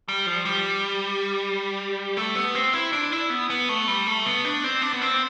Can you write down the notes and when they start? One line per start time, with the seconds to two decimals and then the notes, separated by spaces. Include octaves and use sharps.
0.08 G3
0.26 F3
0.45 G3
2.17 A3
2.35 B3
2.55 C4
2.73 E4
2.93 D4
3.12 E4
3.30 B3
3.50 B3
3.69 A3
3.87 G3
4.07 A3
4.26 B3
4.45 D4
4.64 C4
4.82 D4
4.93 B3
5.02 C4